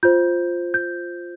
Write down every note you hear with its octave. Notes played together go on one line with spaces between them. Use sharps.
F4 C5 G6
G6